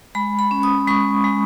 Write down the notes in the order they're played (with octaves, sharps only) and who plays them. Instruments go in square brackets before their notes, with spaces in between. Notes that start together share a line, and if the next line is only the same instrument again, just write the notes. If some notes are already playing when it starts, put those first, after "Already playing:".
[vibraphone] G#3 B5
B5
C#4
D#6
G#3 C#6
G#3